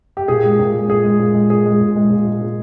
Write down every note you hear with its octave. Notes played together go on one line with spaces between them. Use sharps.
G4
A#2 G#4
G#3
A#2
G#3
A#2 G#4
G#3
A#2
G#3
A#2 G#4
G#3
A#2
G#3
A#2
G#3
A#2